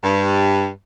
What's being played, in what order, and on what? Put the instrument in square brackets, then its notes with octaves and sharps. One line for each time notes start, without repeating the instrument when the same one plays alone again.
[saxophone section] G2